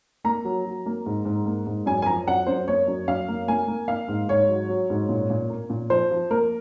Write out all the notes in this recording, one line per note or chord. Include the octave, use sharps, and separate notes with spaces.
A#3 A#5
F#3
F#3
A#3
G#2
G#2
A#3
G#2
F#2 G#5
G#5
F3 A#5
F#2 F#5
F#2 C5
A#3 C#5
F#2
F#2 F5
A#3
A#3 G#5
A#3
A#3 F5
G#2
G#2 C#5
F#3
F#3
G#2
A#2
A#2
A#3
A#2
F3 C5
F3
A#3 A#4